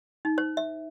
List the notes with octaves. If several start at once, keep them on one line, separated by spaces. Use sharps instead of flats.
D#4
C5
E5